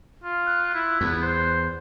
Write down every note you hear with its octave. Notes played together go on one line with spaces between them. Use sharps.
F4
F#6
E4
E2 B3
C5